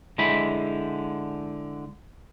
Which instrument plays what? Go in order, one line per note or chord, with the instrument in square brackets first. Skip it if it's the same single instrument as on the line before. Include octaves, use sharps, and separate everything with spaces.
[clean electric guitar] D3 G#3 E4 C5 B5